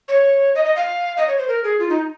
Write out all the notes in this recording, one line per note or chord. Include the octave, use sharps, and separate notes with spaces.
C#5
D#5
D#5
F5
D#5
C#5
C5
A#4
G#4
F4
D#4